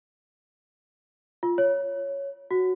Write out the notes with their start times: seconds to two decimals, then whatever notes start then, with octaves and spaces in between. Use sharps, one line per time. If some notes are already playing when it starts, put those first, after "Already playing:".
1.43 F4
1.58 C#5
2.51 F#4